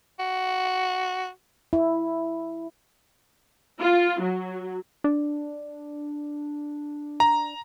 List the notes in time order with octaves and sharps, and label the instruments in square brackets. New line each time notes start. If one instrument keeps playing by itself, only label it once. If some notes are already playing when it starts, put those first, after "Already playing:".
[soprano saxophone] F#4
[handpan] E4
[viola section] F4
F#3
[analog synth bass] D4
[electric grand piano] A#5